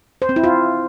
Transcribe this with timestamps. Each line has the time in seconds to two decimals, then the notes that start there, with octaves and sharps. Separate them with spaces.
0.22 C5
0.29 C4
0.36 E4
0.44 F4